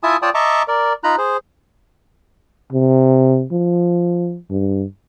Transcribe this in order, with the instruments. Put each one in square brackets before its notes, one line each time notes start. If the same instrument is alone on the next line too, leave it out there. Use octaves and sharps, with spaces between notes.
[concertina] E4 F4 E5 G#5 A5 D#6
F4 C#5 D5 G5 A5 D#6
D#5 E5 A5 A#5 C#6 D6
A#4 D5
D#4 F4 A#5 B5 F#6
G#4 C5
[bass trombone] C3
F3
G2